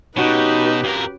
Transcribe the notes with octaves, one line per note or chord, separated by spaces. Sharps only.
B2 C#4 D#4 F#4 G4 B4
F2 A#4